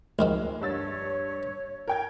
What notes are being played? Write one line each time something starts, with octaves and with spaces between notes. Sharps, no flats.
C#2 D#3 F3 G#3
G2 C#5 E6 A6
A#4 G5 G#6